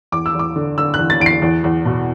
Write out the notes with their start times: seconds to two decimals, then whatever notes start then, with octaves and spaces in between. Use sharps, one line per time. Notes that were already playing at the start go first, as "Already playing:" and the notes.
0.12 E2 D6
0.26 E6
0.34 E2
0.39 D6
0.56 D3
0.78 D3 E6
0.94 F#6
0.99 E2
1.10 A6
1.20 E2 D7
1.26 C7
1.42 E2
1.64 E2
1.85 B2